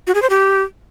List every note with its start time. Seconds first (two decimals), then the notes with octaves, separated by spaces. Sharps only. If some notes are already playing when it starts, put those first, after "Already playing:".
0.07 F#4
0.15 G#4
0.22 C5
0.30 G4